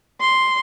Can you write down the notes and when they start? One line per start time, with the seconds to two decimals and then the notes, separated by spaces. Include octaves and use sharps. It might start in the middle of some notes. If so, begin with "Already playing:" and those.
0.21 C6